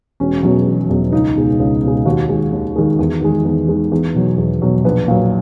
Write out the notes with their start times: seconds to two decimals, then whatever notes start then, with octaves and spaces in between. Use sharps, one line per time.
0.20 E1 C#4
0.43 E2 B2 F#3
0.67 E1
0.89 E2 B2 F#3
1.12 C#2 D#4
1.36 B2 G#3
1.60 C#2
1.82 B2
1.87 G#3
2.05 D#2 F#4
2.29 D#3 G#3
2.52 D#2
2.76 D#3 G#3
2.99 E2
3.21 D#3 G#3
3.45 E2
3.68 D#3 G#3
3.92 E2
4.15 B2 F#3
4.38 E2
4.62 B2 F#3
4.84 A#1 B4
5.08 A#2 F#3